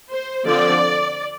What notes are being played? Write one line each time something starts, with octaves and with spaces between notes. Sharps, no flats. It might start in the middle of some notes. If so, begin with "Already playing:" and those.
C5
D3 F3 C4 D5